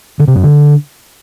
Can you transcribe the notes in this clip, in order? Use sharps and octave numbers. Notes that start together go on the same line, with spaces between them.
D3
C3
F#2
D3